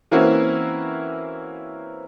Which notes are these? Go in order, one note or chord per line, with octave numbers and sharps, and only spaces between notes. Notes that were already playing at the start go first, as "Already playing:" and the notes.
E3 A#3 C4 C#4 E4 F#4